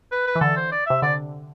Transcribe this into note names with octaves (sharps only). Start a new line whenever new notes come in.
B4
B4
E3
D3 A4
C5
D5
C3 E5
D3 D5